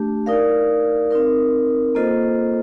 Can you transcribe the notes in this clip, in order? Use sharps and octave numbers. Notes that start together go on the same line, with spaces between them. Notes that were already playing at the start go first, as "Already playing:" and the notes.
Already playing: A3 D4 G4
D#4 A#4 D5 F5
C4 D#4 A#4
A#3 F4 A4 C5 D#5